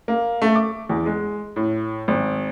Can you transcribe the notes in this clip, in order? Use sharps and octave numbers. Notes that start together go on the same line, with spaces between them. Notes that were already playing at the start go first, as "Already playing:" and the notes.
A#3
A3
D6
E2
G#3
A2
G#1